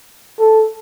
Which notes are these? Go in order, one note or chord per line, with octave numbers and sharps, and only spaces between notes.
A4